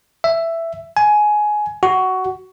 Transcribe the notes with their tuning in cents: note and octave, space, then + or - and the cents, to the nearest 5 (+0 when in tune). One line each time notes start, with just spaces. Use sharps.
E5 +10
G#5 +15
F#4 +15